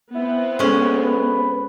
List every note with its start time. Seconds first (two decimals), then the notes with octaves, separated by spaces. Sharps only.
0.15 B3 C4 E4
0.59 D2 G#3 C#4
1.04 B4